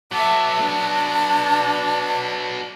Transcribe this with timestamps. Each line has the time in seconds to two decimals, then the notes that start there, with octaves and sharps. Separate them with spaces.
0.12 F#3 B3 E5 A5 D6
0.60 D4